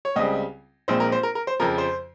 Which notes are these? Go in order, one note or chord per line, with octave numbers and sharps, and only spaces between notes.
C#5
C#2 C#3 G3 C4 D#5
A#1 A#2 G#3 C4 C5
A#4
C5
A#4
A#4
C5
F2 C#3 F3 A#4
C5